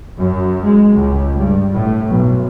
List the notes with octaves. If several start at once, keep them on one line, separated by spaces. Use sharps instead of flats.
F#2
G#3
C#2
G2
A2
B1